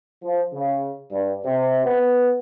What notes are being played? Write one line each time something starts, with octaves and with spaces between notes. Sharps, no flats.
F3
C#3
G2
C3
B3